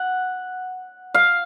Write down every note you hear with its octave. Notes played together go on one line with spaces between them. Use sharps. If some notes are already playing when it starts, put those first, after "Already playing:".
Already playing: F#5
F5